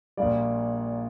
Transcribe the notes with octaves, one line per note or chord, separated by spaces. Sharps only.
A#1 A#2 G3 D5 F5